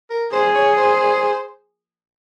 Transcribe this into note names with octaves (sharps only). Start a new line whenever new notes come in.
A#4
G#4 C5
C#5
C5